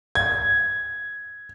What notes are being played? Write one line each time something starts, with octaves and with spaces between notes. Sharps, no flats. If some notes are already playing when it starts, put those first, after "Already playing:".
G#6